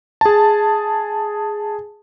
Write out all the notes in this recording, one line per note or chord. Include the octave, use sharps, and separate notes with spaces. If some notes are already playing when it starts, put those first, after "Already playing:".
G#4 A5